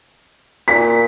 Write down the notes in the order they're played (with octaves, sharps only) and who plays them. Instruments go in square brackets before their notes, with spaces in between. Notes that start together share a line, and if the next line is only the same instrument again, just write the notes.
[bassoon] A#2 [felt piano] B6